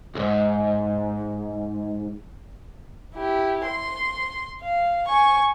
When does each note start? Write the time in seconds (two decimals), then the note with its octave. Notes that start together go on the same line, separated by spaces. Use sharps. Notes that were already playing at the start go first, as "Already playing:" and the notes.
0.15 C2 G#2
3.16 E4 G4
3.66 C6
4.62 F5
5.08 G#5 C#6